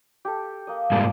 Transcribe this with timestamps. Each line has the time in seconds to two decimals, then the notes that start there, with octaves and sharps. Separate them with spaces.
0.25 G4 A4
0.67 A#3 D#5
0.92 G#2 F3 G3 A#3 D6